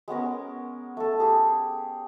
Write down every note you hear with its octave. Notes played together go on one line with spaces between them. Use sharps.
G#3 B3 C#4 A#4
A3 A4
G4 G#4